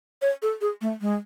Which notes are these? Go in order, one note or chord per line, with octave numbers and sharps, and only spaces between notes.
C#5
A4
G#4
A3
G#3